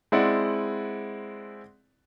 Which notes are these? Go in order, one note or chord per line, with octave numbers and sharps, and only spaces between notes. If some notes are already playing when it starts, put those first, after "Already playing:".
G#3 C4 E4 D5 F#5